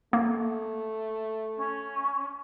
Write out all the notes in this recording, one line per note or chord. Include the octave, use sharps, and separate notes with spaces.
A3 A#3
C#4